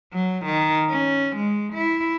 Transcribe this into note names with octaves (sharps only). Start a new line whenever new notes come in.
F#3
D#3
C#4
G#3
E4